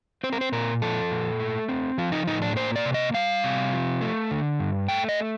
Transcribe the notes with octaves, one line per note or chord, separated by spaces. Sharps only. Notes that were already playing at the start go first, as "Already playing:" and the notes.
C4 C5
A#4
C5
A#2 A#4
F3 A4
A#2
A3
C4
F3 F4
D#4
A2 D#4
D4
A#3 C5
D5
C3
D#5
G3 F5
C3
F3
A3
D3
G2
A3 G5
D#5